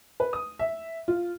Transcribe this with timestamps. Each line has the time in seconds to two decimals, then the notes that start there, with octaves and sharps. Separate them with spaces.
0.20 B4
0.33 D#6
0.59 E5
1.08 F4